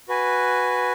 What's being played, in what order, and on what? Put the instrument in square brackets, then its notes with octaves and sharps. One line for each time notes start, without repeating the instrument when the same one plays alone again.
[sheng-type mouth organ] F#4 B4 G#5